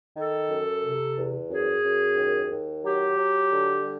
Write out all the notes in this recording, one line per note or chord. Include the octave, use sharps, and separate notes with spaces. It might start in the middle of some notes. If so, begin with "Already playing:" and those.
D#3 A4
F#2
C3
E2
F#2 G#4
F#2
D#2
D#2
F#3 G4
F#3
D3
G3